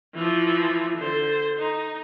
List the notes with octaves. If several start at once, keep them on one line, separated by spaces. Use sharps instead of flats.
E3 F3
D3 C5
D#4